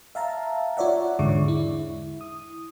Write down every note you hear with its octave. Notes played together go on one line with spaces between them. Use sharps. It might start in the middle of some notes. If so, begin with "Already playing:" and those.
E5 F5 A5 A#5
F4 C#5 D5 E5 F#5
E2 G#2 D3 G#3 C#6 D6
E4
D#6